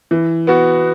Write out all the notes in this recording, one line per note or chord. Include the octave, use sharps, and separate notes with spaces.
E3
B3 F#4